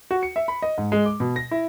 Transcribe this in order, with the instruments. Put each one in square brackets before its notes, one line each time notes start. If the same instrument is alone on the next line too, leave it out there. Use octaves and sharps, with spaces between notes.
[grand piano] F#4
C#7
E5
B5
D#5
G#2
G#3
D6
B2
A#6
E4